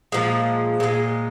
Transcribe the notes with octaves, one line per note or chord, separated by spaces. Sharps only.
A#2 F3 G#3
A#2 F3 G#3